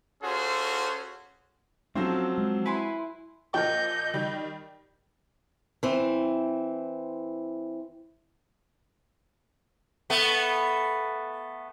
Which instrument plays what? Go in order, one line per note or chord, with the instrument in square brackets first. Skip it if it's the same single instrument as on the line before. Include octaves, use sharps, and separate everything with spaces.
[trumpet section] C#4 F4 F#4 G#4 A4 C5
[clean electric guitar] F3 [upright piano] F#3 C4 C5 [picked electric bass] A3 C#4 [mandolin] A4 F5
[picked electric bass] G#3
[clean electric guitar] E4 [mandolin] B4 G#5 C6
[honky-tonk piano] A#2 F3 [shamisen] A#4 C#5 G5 [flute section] D#5 [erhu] G6
[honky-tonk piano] D#3 G3
[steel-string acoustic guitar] E3 C4
[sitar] A3 B3